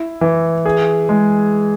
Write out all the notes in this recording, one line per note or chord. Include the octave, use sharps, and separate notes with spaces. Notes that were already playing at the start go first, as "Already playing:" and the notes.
Already playing: E4
E3
G#4
G#3